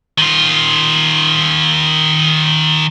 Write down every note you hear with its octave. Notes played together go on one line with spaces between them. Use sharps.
D#3 F4